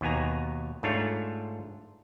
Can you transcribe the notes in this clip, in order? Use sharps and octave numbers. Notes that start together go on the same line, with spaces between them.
D#2 B2 B3 G#5 A#5
G#2 A3 D4 F4 C#5